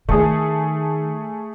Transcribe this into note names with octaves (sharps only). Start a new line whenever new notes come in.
D#3 A3 G#4